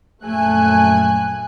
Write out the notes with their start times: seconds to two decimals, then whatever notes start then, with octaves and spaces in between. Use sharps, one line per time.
0.24 A#1 F#2 A3 G#5 F#6